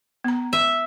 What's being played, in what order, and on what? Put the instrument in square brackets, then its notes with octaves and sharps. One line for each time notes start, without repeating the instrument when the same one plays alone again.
[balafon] B3 A#5
[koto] E5